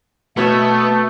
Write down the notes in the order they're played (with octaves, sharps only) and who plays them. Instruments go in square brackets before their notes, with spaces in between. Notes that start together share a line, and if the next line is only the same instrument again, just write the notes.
[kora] B2 C#5 E5 [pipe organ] A3 [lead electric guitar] B3